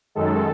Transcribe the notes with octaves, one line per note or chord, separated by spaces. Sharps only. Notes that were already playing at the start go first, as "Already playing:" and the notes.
F#2 D#3 G#3 A4